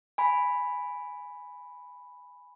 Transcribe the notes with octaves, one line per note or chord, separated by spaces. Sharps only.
G#5 B5